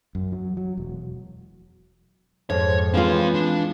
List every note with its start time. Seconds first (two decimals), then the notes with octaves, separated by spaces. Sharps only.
0.15 F#2
0.32 F#3
0.57 F#3
0.77 E1
2.50 F2 G#2 C#5
2.94 E3 G#3 C4 F4 F5
3.34 D4